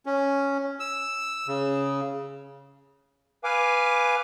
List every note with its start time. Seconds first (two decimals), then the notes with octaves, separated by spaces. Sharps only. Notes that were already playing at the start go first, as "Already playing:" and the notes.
0.06 C#4
0.80 E6
1.47 C#3
3.44 B4 F5 G#5 D6